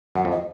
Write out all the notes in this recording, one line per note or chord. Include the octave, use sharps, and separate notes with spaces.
F#2 F#5
F2
D#5